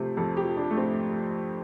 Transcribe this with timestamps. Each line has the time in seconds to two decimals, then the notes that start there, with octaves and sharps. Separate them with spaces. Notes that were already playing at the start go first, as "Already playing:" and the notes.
Already playing: C3 F3 A3 C5
0.17 F2 A4
0.37 G4
0.44 F3
0.57 D4
0.71 A3
0.78 C4